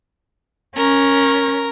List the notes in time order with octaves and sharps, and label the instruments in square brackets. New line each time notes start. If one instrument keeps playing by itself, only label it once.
[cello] C#4 [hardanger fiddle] A#4